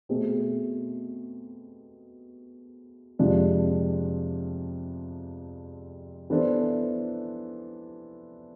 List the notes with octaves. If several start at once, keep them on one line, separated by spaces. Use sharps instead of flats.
B2 A3 C4 G#4
F2 C3 F3 G#3 D4
E3 B3 D4 A4 C5